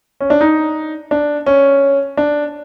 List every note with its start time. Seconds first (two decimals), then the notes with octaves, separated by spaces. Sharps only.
0.21 C#4
0.30 D4
0.41 D#4
1.11 D4
1.46 C#4
2.17 D4